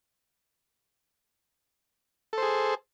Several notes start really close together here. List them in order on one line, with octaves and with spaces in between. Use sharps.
A4 C5 G#4